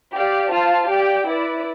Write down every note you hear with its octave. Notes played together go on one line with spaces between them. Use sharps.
G4 D5 F5
F4 C5 F5 A5
G4 D5 G5
E4 B4 D5